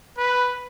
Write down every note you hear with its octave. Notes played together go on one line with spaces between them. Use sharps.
B4